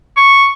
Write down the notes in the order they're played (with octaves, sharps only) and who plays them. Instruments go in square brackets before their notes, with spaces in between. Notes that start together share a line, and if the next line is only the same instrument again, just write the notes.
[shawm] C#6